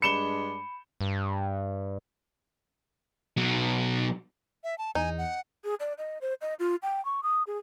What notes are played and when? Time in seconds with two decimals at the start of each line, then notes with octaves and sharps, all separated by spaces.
0.02 G2 G#3 D4 B5 C#7 E7 G7
1.01 G2
3.37 B2 F#3
4.64 E5
4.78 A5
4.95 E2 D#4 G#5
5.18 F#5
5.64 G#4
5.80 D5
5.98 D#5
6.21 C5
6.41 D#5
6.59 F4
6.83 G5
7.05 C#6
7.23 D#6
7.47 G#4